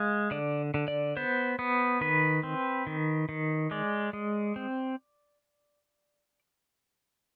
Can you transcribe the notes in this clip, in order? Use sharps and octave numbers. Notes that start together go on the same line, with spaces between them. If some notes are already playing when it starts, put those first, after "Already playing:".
Already playing: G#3 F5
D3 D5
D3
D5
B3 C5
B3
D#3 B4
C4
D#3
D#3
G#3 D5
G#3
C4